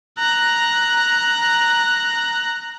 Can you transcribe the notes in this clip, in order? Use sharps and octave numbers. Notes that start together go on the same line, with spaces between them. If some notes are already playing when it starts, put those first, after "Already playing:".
A#5 F#6